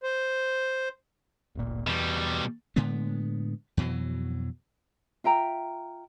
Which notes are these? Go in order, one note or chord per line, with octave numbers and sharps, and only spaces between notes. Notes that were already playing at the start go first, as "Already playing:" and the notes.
C5
D1 G1 A#2
E2 B2 G3
A2 D3 G#3 B3
F2 B2 E3 F#3
F4 E5 G5 A#5